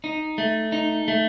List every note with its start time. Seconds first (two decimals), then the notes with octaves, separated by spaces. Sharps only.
0.04 D#4
0.38 A3
0.72 D#4
1.08 A3